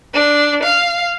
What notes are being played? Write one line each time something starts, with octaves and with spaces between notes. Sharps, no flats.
D4
F5